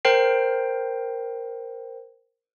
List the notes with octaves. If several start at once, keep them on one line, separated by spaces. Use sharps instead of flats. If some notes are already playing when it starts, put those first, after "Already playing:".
A#4 C5 G5 C7